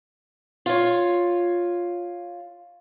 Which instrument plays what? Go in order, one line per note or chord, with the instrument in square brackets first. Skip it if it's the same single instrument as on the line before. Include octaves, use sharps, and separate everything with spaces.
[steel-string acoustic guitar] F4 C#5